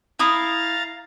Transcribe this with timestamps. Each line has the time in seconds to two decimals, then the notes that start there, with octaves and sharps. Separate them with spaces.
0.19 E4 F5 A#5 D#6 A6